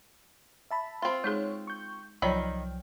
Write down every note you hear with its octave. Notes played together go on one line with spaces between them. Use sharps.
E5 A5 B5
C4 F4
G#3 D#4 G#4 C#5
C#6 G6
C2 D#3 F3 F#3 C#5 D5 G5 B5